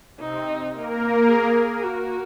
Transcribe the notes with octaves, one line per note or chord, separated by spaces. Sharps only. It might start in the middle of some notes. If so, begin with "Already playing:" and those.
C3 C4 D#4
A#3 A#4
G#4
F#4